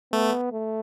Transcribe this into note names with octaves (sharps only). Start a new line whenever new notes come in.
A3 B3
A3